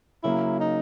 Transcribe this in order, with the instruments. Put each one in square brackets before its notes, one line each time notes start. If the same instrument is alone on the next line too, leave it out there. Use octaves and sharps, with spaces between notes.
[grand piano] C#3 F#3 A#3 [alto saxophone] E4
[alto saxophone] D#4